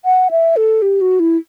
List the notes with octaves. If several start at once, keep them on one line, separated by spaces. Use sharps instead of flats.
F#5
E5
A4
G4
F#4
E4